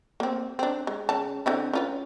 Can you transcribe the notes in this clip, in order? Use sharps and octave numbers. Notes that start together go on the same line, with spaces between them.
A#3 C4
C4 D4
G#3
C#3 A5
D3 C4 E4
C#4 F4 B4